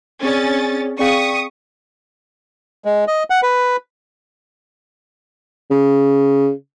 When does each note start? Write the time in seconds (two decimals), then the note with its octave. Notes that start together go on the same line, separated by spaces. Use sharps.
0.23 C4 C#4 G#4 D5 A6
0.99 C4 G#4 D5 F5 G5 C#6 D#6 B6
2.85 G#3
3.07 D#5
3.30 F#5
3.43 B4
5.71 C#3